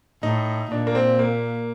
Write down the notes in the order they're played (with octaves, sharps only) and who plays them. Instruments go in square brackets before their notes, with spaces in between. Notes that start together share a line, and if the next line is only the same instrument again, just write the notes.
[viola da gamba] A2 [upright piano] D#4
[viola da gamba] A#2 [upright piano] D4
[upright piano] A#3
C4
A#3